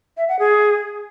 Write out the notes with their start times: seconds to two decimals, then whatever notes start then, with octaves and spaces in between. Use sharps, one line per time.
0.17 E5
0.28 F#5
0.39 G#4